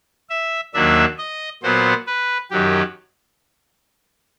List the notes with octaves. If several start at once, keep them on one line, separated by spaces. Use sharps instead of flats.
E5
D#2 D#3 F#3 A#3 D4 E5
D#5
A#2 F#3 B3 C5
B4
F#2 D#3 F#3 G4